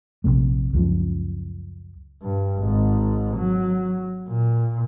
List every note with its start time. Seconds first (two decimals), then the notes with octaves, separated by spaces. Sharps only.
0.24 A#1 F2 C3 A3
0.73 C#2 F#2 C#3 F3
2.22 G2
2.60 G#1 G#2
3.36 F#3
4.28 A#2